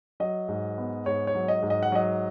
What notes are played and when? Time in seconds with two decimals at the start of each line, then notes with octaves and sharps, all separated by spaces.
0.20 F#3 D#5
0.48 G#2
0.78 B3
1.06 G#2 C#5
1.27 C#5
1.35 F#3
1.48 D#5
1.62 G#2
1.70 D#5
1.83 F#5
1.92 F#3 D#5